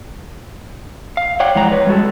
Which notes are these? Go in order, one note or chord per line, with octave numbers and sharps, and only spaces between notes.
F5
C#5 D5 F#5 G5
F2 E3 G#3 F#5 A#5
B4 C#5
G3 G#3 F#4 A4